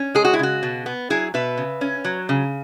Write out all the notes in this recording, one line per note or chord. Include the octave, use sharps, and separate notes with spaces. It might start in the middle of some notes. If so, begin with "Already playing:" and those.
Already playing: C#4
G#3 G#4
F#4
E4
C#3 F#4
B2
B3
F#3 E4 G#4
B2 B4 E5
C#3
C#4
F#3
C#3